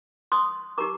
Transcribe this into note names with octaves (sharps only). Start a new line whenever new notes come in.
C6 D#6
D#4 G4 A#4 A#5 D6